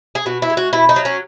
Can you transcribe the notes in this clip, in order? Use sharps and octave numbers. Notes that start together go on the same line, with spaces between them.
G#4
B2 F#4
E4
G#3
F#4
B2 E4
D#4
F#3
C#4